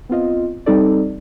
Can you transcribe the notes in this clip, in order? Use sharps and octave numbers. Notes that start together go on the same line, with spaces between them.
B3 C4 F4 D#5
G3 C4 D#4 A4 D5